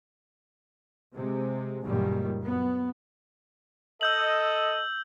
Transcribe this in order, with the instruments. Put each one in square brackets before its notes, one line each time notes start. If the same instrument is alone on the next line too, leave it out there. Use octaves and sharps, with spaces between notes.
[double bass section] C3 G#3
F#1 C#2 F#2 A#2 D#3 G3
F#2 B3
[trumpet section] A4 D#5 [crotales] E6 G6 F#7